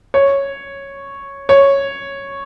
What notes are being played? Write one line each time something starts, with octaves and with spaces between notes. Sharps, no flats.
C#5
C#5